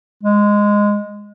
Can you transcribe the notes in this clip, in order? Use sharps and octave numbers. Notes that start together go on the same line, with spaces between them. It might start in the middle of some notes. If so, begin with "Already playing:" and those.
G#3